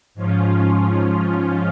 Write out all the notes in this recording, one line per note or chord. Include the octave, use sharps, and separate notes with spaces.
G#2 F3 C#4 F4